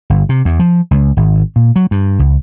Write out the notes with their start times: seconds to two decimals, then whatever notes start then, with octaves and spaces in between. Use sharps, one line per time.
0.10 G1
0.29 C3
0.45 E2
0.60 F3
0.91 C#2
1.17 G#1
1.56 A#2
1.76 F#3
1.91 G2
2.19 C#2